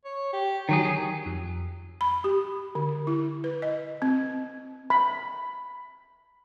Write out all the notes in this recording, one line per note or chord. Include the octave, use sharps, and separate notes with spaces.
C#5
G4
D#3 F#3 G4 G#4
G#4
F2
B5
G4
D3
E4
B4
D#5
C4
B5